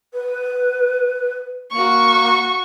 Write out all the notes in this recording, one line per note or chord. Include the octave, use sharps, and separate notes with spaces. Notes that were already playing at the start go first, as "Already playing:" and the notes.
B4
A#3 F#4 C#6